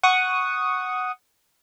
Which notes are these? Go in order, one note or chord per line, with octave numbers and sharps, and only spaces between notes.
F#5 C#6 D#6